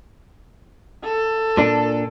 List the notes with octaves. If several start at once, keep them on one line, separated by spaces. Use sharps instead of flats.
A4
A#2 D4